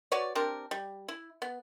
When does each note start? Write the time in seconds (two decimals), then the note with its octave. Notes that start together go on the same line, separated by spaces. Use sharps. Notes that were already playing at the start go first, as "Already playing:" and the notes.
0.12 F#4 B4 C#5 D5
0.35 C4 D4 G4 A#4
0.71 G3
1.08 E4
1.42 B3